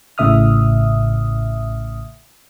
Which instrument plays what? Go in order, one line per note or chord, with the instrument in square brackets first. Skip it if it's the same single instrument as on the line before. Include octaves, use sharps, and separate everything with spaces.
[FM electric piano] A1 A2 C#3 E5 D#6 F6